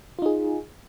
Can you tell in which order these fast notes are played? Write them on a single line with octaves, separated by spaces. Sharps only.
F4 D#4 G#4